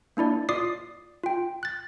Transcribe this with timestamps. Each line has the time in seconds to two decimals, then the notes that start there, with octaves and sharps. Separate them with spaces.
0.17 A#3 D4 E4 D5
0.49 F4 D5 D6 D#6 C7
1.24 F4 G5
1.63 F#6 A6